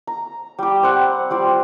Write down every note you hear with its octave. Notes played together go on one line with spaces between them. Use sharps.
A#5
G3 G4
C4 F#5
G3 F4 D5